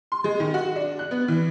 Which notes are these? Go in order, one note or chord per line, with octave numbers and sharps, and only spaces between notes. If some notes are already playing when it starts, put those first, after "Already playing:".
C6
G#3
D#3
F#4
D4
F#6
B3
E3